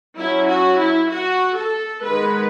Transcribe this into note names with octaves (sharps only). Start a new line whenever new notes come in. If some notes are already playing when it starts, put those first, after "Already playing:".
F#3 C#4 E4
F#4
E4
F#4
A4
D#3 G#3 B3 B4